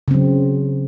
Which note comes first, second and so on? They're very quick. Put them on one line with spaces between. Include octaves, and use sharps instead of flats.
C#3 C4 F#3